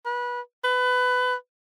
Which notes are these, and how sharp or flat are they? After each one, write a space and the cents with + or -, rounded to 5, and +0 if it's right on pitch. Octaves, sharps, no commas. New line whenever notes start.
B4 -25
B4 +20